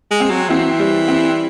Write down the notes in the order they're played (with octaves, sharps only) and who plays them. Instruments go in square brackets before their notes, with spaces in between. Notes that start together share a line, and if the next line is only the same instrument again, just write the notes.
[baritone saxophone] G#3
[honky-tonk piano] C4
[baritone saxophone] F#3
[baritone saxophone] E3 [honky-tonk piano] C4
[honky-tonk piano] G3
C4